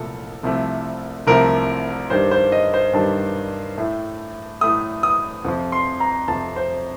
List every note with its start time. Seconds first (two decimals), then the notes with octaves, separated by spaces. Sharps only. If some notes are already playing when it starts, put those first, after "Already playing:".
Already playing: C2 A#2 F3 A3 A4
0.43 C2 C3 F3 A3
1.27 C2 C3 F3 A3 A#4
2.10 G2 D#3 G3 C5
2.31 C5
2.52 D#5
2.74 C5
2.93 G2 D#3 G3 A5
3.78 A2 A3
4.61 A2 A3 D#6
5.03 D#6
5.45 F2 C3 F3
5.72 C6
6.00 A#5
6.28 F2 C3 F3 A5
6.56 C5